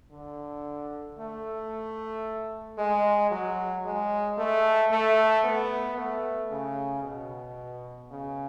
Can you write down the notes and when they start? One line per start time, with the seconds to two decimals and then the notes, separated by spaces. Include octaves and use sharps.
0.12 D3
1.19 A3
2.78 G#3
3.31 F#3
3.85 G#3
4.38 A3
4.91 A3
5.45 B3
5.97 A3
6.51 C#3
7.04 B2
8.10 C#3